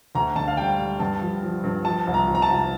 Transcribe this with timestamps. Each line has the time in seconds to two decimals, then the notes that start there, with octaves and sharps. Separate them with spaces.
0.15 D2 A#5
0.35 D3 A5
0.48 F5
0.57 G3 G5
0.79 G3
0.99 G2 A5
1.22 F3
1.43 F3
1.64 G2
1.85 F3 A5
2.07 C2
2.14 A#5
2.27 F3
2.35 A#5
2.42 A5
2.49 C2